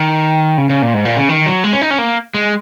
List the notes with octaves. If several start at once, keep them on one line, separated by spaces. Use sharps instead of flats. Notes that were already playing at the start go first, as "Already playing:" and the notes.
Already playing: D#3
C#3
C#3
A#2
G#2
A#2
C#3
D#3
F#3
G#3
C#4
D#4
C#4
A#3
G#3